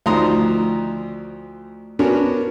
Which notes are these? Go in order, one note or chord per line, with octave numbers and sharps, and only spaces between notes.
D2 D#3 F3 A#5 C6 D#6
B3 C#4 D4 F#4 A#4